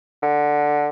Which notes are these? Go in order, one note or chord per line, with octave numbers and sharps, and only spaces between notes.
D3